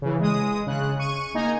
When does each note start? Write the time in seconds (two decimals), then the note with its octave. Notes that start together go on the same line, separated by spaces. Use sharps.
0.02 C#3 E3
0.21 G#3 D#6
0.67 C#3 F#6
0.99 C#6 D#7
1.34 A#3 D#4 G#5 A#5